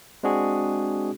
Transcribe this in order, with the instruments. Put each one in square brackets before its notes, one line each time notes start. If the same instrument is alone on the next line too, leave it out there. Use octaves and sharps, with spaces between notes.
[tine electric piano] G#3 C4 D4 F#4 G#4